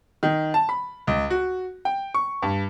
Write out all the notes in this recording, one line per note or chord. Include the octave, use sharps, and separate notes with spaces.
D#3
A5
B5
C#2
F#4
G5
C#6
G2